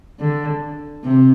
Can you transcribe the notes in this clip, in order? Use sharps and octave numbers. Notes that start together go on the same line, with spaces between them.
D3
C3